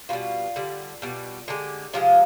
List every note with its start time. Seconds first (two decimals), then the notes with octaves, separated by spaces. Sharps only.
0.09 B2 G3 F4
0.56 D3 G3
1.02 B2 G3
1.48 D3 G#3 G4
1.93 C3 F3 G#3 F4